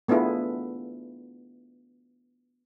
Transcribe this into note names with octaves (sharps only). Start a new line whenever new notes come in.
A3 B3 D4 E4 F4 G#4